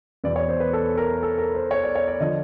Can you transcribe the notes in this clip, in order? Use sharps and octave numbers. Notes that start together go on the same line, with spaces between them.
E2 B2 D5
C#5
C5
B4
A4
A#4
A4
A#4
C5
C#5
D5
C#5
D5
D3 F3 D#5